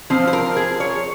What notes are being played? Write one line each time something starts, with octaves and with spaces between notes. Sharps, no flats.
F3 C4 F4 C5
C5
A#4
G#4
C#5